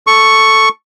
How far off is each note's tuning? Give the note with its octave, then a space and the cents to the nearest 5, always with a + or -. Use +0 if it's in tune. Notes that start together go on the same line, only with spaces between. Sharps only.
A4 +0 C#6 +0